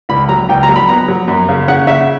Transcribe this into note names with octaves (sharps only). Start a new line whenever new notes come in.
C#2 B5
F#3 A#5
C#2 G5
A#5
F#3
B5
B3 A#5
F#3
F#2
C#3
C#3 F#5
C#3 E5